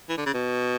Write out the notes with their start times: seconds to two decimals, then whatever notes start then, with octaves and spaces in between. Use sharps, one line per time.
0.09 E3
0.17 D3
0.26 C#3
0.34 B2